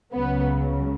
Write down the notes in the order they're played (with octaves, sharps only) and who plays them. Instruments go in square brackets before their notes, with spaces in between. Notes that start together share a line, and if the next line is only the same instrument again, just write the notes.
[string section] C#2 C#3 F#3 B3